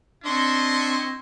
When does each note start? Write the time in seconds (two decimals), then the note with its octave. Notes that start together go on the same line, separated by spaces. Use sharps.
0.25 C4 D4 E4 D#5 C6 C#6